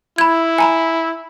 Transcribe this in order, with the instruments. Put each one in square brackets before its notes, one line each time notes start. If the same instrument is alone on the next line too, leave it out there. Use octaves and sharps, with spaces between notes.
[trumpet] E4 [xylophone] B5 G#6
[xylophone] G#5 A#5 B5